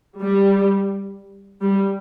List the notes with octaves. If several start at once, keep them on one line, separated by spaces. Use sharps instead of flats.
G3
G3